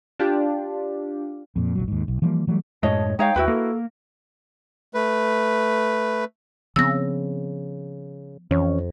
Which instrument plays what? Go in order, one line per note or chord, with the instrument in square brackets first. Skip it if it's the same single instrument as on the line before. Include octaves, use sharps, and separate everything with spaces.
[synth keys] D4 F4 G4
[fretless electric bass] F2 A#2
F1 A#1 F#3
D#2 G#2
B1
E3 F3 G3 A#3
E3 F#3 G3 A3
[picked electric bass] F#2 A2 G#3 [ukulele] C#5 D#5 [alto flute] A5
[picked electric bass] G#3 [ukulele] D#4 C#5 F5 [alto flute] G5
[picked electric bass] D#2 [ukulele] E4 F#4 B4
[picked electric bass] A#3 [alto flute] A4
[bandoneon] A3 B4
[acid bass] C#3 [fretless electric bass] F3 B3 C4 [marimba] E6 A#6
[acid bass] F2 [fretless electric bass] E3 [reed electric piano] C#4 C#5